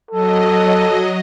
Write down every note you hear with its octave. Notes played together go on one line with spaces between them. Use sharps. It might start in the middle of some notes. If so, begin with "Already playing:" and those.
F#3 A4 D#5